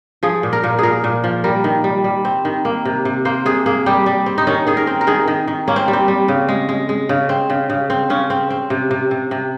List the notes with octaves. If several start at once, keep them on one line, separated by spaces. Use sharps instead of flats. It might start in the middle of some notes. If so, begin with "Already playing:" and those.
F3 G#4
A#2
A#4
A#2
A#2 G#4 A#4
A#2
F3
G3 A#4
D#3
G3
G3
C4
D#3
A#3
C3
C3
A#3 C5
C3 G#4
A#3 G#4
G3 G4
G3
C4
D#4
D#3 C#4
D#3 G#4
A#4
C4
A#4
D#3 G#4
D#3
D#3
A#3 C#4
C4
G3
C4
G3
C#3
G#3
G#3
G#3
C#3
C4
C#3
C#3
C4
C#3 C#4
C4
C4
C3
C3
C3
C3